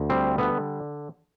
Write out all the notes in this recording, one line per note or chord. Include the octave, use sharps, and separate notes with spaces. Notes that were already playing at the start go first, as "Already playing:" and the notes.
Already playing: D2
G3 C4
D3 B3